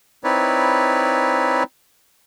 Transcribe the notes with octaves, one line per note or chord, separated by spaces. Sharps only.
C4 D#4 E4 B4 C#5 D5